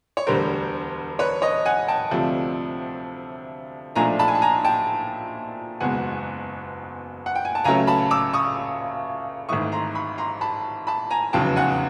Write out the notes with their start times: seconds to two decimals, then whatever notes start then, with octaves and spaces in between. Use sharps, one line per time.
0.17 C#5
0.27 E1 D2 D3 G3 A#4 C5
1.19 B4 C#5
1.42 C#5 D#5
1.66 F#5 G#5
1.88 G5 A5
2.11 D2 C3 F3 A3 D4
3.96 B1 A#2 F3 A3 D4 G#5 A#5
4.19 A5 B5
4.28 G#5
4.35 A5
4.42 G#5 A#5
4.65 G5 A5
5.80 F#1 E2 B2 G#3 F#5 G#5
7.26 F#5
7.35 G5
7.45 G#5
7.55 A5
7.64 C#2 C#3 F#3 A3 C#4 G#5 A#5
7.87 A5 B5
8.11 D6 E6
8.33 C#6 D#6
9.49 G#1 G#2 E3 A3 C#6 D#6
9.72 A#5 C6
9.95 B5 C#6
10.18 A#5 C6
10.41 A5 B5
10.87 A5 B5
11.11 G#5 A#5
11.33 F1 E2 C#3 F#3 B3 G5 A5
11.56 F#5 G#5